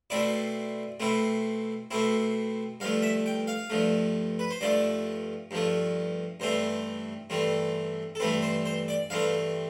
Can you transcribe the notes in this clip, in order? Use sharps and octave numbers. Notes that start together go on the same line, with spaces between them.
B2 A3 C4 E4 D5
B2 A3 C4 E4
B2 A3 C4 E4
G2 F3 A3 F5
E5
G5
F5
G2 F3 A3
B4
C5
G2 F3 A3 D5
G2 F3 A3
G2 E3 A3 C4 C5
G2 E3 A3 C4
A4
G2 E3 A3 C4 B4
C5
C5
D5
G2 E3 A3 C4 F5